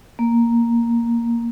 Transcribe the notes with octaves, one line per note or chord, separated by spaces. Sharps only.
A#3